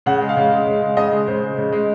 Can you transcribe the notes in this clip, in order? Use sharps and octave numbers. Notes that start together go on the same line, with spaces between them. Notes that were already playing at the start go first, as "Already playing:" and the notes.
C#3 F#5
G#3
F5
C#3
G#3
C#3
G#3
C#3 D#5
G#3
C#3 C5
G#3
C#3
G#3